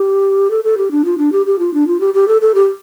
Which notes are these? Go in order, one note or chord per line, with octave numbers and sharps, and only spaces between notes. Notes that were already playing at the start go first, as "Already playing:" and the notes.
Already playing: G4
A4
A4
G4
D4
F4
D4
G4
G4
F4
D4
F4
G4
G4
A4
A4
G4